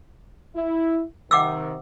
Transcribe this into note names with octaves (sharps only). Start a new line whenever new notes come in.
E4
C3 D#3 F#5 D6 E6